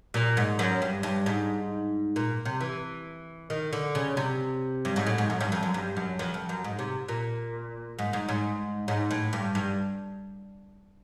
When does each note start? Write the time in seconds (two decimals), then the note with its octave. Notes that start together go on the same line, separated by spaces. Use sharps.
0.14 A#2
0.37 G#2
0.59 F#2
0.82 G2
1.03 G2
1.26 G#2
2.16 A#2
2.45 C3
2.61 E3
3.50 D#3
3.73 D3
3.95 C#3
4.17 C3
4.85 G2
4.96 G#2
5.07 A2
5.18 G#2
5.30 F#2
5.41 G2
5.52 F2
5.63 F#2
5.74 G2
5.97 F#2
6.19 F2
6.34 F2
6.49 F#2
6.64 G#2
6.79 C3
7.08 A#2
7.99 G#2
8.13 G#2
8.29 G#2
8.88 G#2
9.11 A2
9.33 G2
9.55 G2